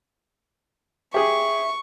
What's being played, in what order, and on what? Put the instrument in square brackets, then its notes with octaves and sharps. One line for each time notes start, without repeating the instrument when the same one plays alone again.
[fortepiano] G4 G#4 [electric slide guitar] E5 [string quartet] C#6